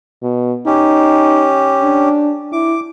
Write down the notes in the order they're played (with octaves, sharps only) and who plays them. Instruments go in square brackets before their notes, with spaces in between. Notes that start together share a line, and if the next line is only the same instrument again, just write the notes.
[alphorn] B2
[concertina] C#4 G4 [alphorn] D#4
[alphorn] D4
[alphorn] E4 [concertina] D6